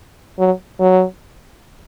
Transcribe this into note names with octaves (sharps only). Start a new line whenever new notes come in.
F#3
F#3